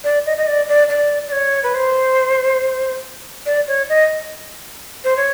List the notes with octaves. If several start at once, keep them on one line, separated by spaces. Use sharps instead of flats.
D5
D#5
D#5
D5
D5
D5
D5
C#5
B4
C5
D5
C#5
D#5
C5
C#5